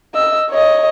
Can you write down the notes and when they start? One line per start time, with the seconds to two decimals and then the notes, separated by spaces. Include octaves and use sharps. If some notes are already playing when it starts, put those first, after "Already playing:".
0.14 D#5 E6
0.50 C#5 D#5